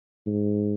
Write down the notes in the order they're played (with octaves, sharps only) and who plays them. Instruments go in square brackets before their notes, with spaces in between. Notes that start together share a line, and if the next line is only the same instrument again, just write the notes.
[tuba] G#2